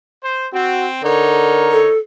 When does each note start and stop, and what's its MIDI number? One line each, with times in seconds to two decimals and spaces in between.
0.23 0.48 72
0.53 1.01 60
0.53 0.88 66
1.03 1.85 50
1.03 1.93 63
1.03 1.83 70
1.03 1.93 73
1.72 1.98 69